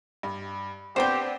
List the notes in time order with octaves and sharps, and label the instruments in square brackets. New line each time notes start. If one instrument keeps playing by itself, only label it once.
[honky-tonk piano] G2
[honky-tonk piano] B3 C4 D4 [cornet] G4 [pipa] C5 G5